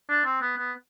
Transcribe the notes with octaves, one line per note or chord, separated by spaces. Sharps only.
D4
C4
B3
B3